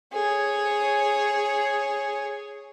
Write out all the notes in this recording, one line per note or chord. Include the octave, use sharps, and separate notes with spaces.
G#4 C#5